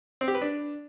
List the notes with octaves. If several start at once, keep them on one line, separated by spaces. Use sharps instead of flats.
C4
G4
B4
D4